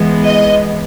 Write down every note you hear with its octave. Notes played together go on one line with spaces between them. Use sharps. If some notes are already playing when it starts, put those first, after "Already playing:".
Already playing: E3 G#3 B3
D#5